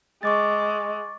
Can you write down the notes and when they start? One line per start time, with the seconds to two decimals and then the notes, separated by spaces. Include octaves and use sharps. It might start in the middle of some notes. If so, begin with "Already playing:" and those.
0.23 G#3 C#6 D6 A6